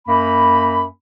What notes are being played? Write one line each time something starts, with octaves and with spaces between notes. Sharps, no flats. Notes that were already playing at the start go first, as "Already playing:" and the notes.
F#2 A#3 B5